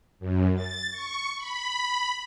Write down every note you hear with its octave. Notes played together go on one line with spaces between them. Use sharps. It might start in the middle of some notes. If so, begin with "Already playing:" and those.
F#2
A6
C#6
B5